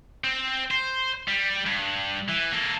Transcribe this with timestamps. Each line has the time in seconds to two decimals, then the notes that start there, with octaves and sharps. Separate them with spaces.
0.24 C4
0.71 C5
1.28 G3
1.66 G2
2.28 E3
2.52 A#3 A4